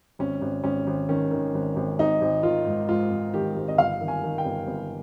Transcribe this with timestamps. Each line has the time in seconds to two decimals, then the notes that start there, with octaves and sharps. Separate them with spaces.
0.19 G#1 C#4
0.41 G#1
0.64 G#1 C#4
0.87 G#1
1.09 D#3 C#4
1.31 D#3
1.54 G#1
1.76 G#1
1.99 G#1 D#4
2.21 G#1
2.43 D#3 F4
2.66 G#2
2.89 G#2 F4
3.11 G#2
3.34 D#3 G4
3.56 G#1
3.68 D#5
3.78 G1 F5
4.01 D#3
4.08 G#5
4.23 D#3
4.38 G5
4.45 G1
4.67 G1